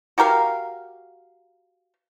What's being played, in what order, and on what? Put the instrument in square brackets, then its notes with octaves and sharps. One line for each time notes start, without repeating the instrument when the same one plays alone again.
[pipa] F#4 G4 A#4 F5